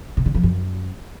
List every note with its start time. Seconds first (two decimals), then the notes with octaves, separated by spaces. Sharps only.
0.17 C3
0.26 D3
0.35 F3
0.43 F#2